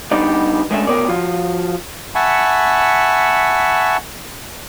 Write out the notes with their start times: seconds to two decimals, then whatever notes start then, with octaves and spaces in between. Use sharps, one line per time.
0.11 G3 B3 D4 D#4 D5
0.71 G#3 A3 C#4 D4 E4 E5
0.87 D2 B3 A#4 C#5 D5
1.08 F3 F4 F#4
2.15 E5 F#5 G#5 A5 B5 C#6